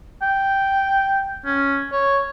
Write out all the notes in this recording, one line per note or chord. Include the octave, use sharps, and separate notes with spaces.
G5
C#4
C#5